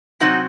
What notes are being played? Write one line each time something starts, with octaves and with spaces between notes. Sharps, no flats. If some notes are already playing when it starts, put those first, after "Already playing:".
C3 F#3 C4 D#4 F#4